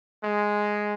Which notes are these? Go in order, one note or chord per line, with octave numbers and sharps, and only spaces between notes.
G#3